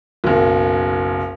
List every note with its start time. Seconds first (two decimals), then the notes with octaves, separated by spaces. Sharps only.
0.24 F#1 B1